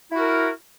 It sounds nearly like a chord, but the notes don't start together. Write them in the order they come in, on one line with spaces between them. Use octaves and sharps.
E4 F#4 A#4